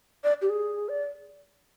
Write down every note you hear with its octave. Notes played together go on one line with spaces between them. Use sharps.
D5
G4
G#4
D5